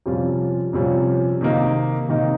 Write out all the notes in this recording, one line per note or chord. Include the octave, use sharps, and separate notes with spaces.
F2 C3 G3 C#4 F4
F2 C3 G3 C#4 F4
C3 D#3 A#3 D#4
C3 D#3 A#3 D#4